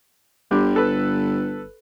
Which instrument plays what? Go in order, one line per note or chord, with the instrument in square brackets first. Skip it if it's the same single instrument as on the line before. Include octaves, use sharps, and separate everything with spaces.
[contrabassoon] G1 [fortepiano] D3 G3
[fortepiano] A4 B4